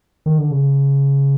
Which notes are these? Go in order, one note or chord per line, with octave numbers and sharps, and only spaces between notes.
D#3
D3
C#3